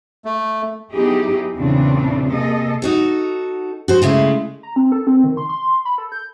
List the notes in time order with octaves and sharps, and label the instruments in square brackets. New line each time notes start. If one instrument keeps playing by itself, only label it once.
[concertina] A3
[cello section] F#3 B3 D#4 E4 G4 G#4
E2 A#2 C#3 E3 C4 D4
C3 A#3 G#4 A4 D#5
[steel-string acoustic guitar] D#4 F#4 A4
F#4 C5
C#3 G#3 A3 E4
[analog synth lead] A#5
C4
A4
C4
D#3
C6
C6
B5
A4
G6